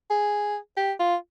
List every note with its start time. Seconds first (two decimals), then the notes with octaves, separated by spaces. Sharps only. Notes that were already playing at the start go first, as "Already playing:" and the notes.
0.10 G#4
0.77 G4
1.00 F4